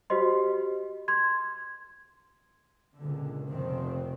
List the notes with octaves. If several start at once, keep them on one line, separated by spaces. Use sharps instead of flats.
F#4 G4 C5 D#5 C6
C6 G#6
C#2 A#2 D3
F1 F2 C3 D#3 C4